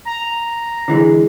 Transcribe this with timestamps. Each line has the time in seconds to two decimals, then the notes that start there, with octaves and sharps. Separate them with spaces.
0.05 A#5
0.88 D3 E3 G#3